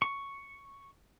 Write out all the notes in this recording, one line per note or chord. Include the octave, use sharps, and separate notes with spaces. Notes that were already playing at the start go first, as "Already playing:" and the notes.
C#6